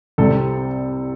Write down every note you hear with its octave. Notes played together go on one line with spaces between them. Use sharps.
C2 C3 G3 C4 A4